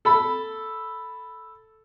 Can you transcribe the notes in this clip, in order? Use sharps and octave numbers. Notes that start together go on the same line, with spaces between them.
A4 B5